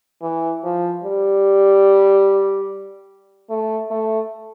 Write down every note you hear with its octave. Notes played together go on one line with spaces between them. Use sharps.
E3
F3
G3
A3
A3